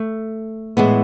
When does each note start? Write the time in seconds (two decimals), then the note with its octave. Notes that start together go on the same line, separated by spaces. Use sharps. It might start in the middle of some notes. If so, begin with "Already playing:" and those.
Already playing: A3
0.77 A2 E3 G#3 B3